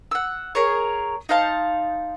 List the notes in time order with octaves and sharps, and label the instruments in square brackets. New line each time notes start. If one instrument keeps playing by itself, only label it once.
[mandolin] F#5 E6
G#4 A#4 C#5
D#4 C5 F5 A5